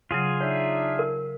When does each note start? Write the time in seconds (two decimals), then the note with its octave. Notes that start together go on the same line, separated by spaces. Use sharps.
0.11 C#3 F#3 F4 G#4
0.41 D4 D#4 C#5 E5
0.99 A#4